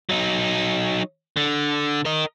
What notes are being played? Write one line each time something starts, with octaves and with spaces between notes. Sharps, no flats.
F#3 D#4
D3
A#4 D#5